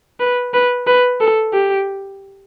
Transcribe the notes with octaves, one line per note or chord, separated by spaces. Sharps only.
B4
B4
B4
A4
G4